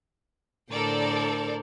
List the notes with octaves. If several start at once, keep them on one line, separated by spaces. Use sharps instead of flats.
A2 D3 A4 A#4 C5 D5